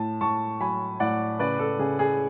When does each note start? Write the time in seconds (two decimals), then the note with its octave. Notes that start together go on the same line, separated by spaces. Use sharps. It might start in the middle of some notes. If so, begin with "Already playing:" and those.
Already playing: A2 A5
0.21 A2 A5 C#6
0.60 F#3 G#5 B5
1.00 A2 D5 F#5
1.39 C#3 B4 D5
1.59 A4
1.79 C#3 G#4
1.99 G#4